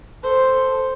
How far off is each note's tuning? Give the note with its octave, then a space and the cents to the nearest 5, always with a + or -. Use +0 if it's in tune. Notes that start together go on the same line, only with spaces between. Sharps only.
A4 +0 C5 +0